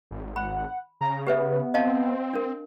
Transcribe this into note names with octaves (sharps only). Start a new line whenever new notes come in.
G#1
F#5 B5
C#3 A#5
B3 G4 B4 E5
C4 D#5 F5 A5
D4 A#4